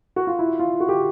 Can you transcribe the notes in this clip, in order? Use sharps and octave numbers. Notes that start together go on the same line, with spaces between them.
F#4
F4
E4
F4
F#4
G4